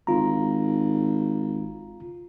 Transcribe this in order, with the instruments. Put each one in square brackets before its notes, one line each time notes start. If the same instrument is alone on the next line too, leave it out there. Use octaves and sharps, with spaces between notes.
[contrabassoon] G#1 [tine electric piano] F4 A#5